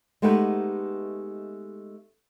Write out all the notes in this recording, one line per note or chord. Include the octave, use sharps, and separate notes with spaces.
G#3 A3 B3 D#4 G4 B4